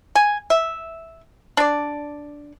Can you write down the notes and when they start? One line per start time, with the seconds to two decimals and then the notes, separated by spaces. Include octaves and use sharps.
0.15 G#5
0.50 E5
1.57 D4 D5